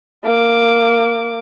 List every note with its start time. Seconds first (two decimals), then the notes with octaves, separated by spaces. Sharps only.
0.24 A#3 D6